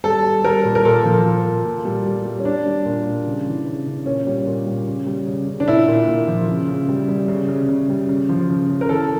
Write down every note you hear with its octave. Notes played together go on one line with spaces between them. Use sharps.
G3 A4
G3
G3 A#4
A#2
A#4
A#2 A4
F3
F3
A#2
A#2
G3
G3
G3
C#4
G3 D4
G3
A#2
G3
C#3
E3
C#3
C#3
A#2 C#4
G3
A#2
G3
C#3
G3
C#3
C#3
D4
A#2 E4
A#2
A#2
F3
C#3
C#3
G3
G3
C#3
C#3
C#3
G3
C#3
F3
C#3
C#3
A#4
E3 A4